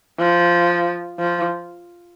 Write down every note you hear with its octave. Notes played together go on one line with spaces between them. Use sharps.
F3
F3